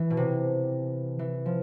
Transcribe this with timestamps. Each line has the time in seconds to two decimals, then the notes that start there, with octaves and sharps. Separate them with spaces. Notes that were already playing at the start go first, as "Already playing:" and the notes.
Already playing: E3
0.10 B2
0.17 C3
1.19 E3
1.46 F3